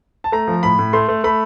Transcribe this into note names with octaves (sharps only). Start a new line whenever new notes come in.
A5
A3 A#5
F3
A2 B5
A2
A3 C6
A3
A3 B5